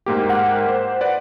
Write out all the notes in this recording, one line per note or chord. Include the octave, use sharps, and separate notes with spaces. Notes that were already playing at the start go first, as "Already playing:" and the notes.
G#2 A#3 G4
F#5
C5
B4 D5 F#5